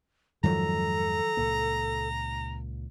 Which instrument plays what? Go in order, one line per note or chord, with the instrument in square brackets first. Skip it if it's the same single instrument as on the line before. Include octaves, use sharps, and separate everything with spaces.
[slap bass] F2 G#2 G#3 [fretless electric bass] D#3 F3 F#3 [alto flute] A4 [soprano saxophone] A#5
[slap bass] C#2 A#2 A#3